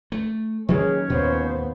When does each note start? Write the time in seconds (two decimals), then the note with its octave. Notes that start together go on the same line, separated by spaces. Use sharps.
0.12 A3
0.69 D#3 F#3 A#3 C#4 G#4 C#5
1.10 D#2 A#2 B3 C5